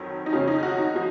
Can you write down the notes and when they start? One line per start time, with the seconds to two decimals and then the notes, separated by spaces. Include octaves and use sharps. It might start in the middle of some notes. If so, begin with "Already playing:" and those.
Already playing: F2 D#3 F#3
0.26 D#4
0.32 F2 C#3 F3 C#4
0.47 D#4
0.63 F#4
0.78 D#4
0.96 F3